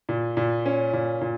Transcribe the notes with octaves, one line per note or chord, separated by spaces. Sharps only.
A#2
A#2
C#4
A#2
A#2